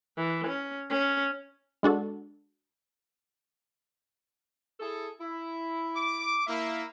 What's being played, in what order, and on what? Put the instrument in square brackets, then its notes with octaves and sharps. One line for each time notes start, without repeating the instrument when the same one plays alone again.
[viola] E3
C#4
C#4
[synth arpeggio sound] G#3 D4 F#4 A4
[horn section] E4 G#4 A4
E4
[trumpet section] D6
[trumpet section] A#3 [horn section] E4 E5